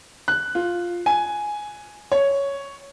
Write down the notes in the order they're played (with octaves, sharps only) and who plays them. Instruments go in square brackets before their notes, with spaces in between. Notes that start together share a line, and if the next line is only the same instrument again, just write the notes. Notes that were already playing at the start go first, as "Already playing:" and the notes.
[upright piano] F#6
F4
G#5
C#5